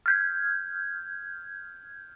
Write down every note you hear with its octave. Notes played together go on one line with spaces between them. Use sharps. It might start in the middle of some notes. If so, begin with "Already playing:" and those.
F6 G6 G#6